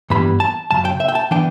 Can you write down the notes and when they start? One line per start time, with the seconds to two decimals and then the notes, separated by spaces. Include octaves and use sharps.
0.10 G2 E3 G3 B3 B5
0.40 A5
0.71 F#2 C#3 A5
0.85 G5
1.00 E5
1.08 G5
1.15 A5
1.31 E3 B3 D4 G5